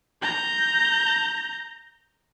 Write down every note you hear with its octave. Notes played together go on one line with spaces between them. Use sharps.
A#5 G6